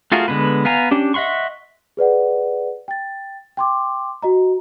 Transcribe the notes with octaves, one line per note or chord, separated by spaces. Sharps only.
A3 F4 F#4 G#4 A#4
D3 G#3 B3 B4
B3 F5 G#5 A#5
C#4 D4 G4
D#5 E5 F#5 C6 C#6
G#4 B4 D5 F#5
G5 A6
G5 C6 D6
F#4 D#5 A#5